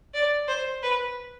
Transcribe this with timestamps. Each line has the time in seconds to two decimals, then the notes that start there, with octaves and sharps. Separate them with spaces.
0.14 D5
0.48 C5
0.83 B4